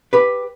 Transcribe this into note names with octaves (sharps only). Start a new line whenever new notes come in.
G4 B4